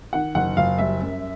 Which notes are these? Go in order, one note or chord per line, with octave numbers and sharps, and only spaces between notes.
D#3 F#5
F#1 F#5
F#1 F5
G3 E5
F#2